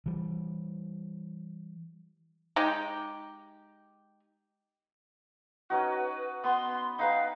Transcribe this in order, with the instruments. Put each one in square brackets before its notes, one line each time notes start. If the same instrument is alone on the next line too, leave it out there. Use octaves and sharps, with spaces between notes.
[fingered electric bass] E3 G3
[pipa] G#3 D#4 G4
[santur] C#4 D#4 F#4 [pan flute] B4
[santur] B3 [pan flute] C6
[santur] D#4 B4 G5 [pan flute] F5